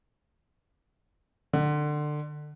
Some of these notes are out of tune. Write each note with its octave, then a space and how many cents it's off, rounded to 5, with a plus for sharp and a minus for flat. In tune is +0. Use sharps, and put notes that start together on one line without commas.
D3 +25